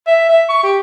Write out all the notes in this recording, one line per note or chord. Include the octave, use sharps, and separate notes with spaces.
E5
E5
C#6
G4